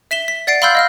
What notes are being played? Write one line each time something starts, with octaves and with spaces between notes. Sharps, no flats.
E5 B6 E7 G7
B6
D5 F#5 A6 C7 D7
F5 B5 C6 E6 F6 G6
D#5 F5 F6